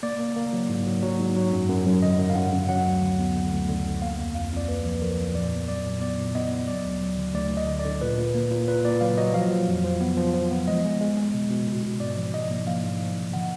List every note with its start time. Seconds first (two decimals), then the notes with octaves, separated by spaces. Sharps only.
0.03 A#3 D5
0.19 A#3
0.36 A#3
0.53 F#3
0.69 G#2
0.86 F#3
1.03 F#3
1.20 G#2
1.36 F#3
1.53 F#2
1.69 F#2
1.86 F#2
2.03 D3 D#5
2.19 F#2
2.30 F5
2.35 F#2 F#5
2.53 F#2
2.69 F#3 F#5
2.86 D2
3.02 D3
3.19 B3
3.36 D3
3.52 D2
3.69 D3
3.86 D2
4.02 A#3 F5
4.19 F2
4.35 F2 F5
4.52 F2 D5
4.68 A#3 B4
4.85 F3
5.02 F3 A#4
5.19 F2
5.35 A#2 D5
5.52 B3
5.68 F#3 D5
5.85 A#2
6.01 B3 D5
6.18 A#2
6.35 B3 D#5
6.52 B3
6.68 F#3 D5
6.85 D2
7.01 F#3
7.18 D3
7.34 D2 D5
7.51 D3
7.57 D#5
7.68 D3
7.79 D5
7.84 D3
8.01 A#2 B4
8.18 A#2
8.35 A#3
8.51 A#2
8.67 A#2 B4
8.85 A#2 D5
9.01 F#3 F5
9.18 F#3 D#5
9.34 F3 F5
9.51 F3
9.68 F2
9.84 F3
10.01 B3
10.17 F3
10.34 F3
10.51 B3
10.68 G#3 D#5
10.84 G#3
11.01 G#3
11.17 G#3
11.34 B2
11.51 B2
11.67 B2
11.83 B2
12.00 G#2 D5
12.17 F3
12.34 G#2 D#5
12.51 A#3
12.67 F3 F5
12.83 G#2
13.00 F3
13.17 G#2
13.33 D3 F#5